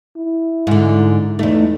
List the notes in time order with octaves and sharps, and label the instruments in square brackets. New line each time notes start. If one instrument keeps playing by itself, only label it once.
[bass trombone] E4
[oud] G#2 D3
[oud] E2 A3 [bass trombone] D#4